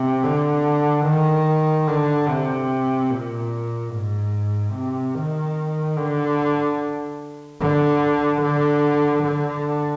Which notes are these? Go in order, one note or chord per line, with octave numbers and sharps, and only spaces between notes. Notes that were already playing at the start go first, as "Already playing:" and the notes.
Already playing: C3
D3
D#3
D3
C3
A#2
G#2
C3
D#3
D3
D3
D3
D3